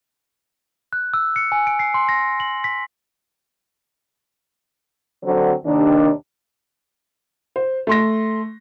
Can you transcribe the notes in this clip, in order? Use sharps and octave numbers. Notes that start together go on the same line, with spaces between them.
F#6
E6
C#7
G#5
D7
C7
C6
A#6
F#7
B6
D3 F#3 C4
D#2 C3 D#3 D4
C5
A3 C6 A#6